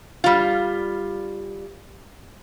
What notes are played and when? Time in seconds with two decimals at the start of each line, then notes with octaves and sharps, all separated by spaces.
0.24 G3 F4